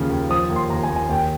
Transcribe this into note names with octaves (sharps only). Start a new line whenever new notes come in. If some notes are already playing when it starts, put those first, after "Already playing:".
Already playing: D#2 C#3 F3
D#2
F3 D#6
D#2
C6
D#2 A#5
G#5
D#2
G#5
D#2 G5